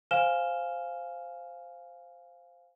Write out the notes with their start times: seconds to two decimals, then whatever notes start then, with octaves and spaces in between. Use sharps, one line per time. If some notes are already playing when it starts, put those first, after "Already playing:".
0.11 C5 F5 G#5 F6 E7 G7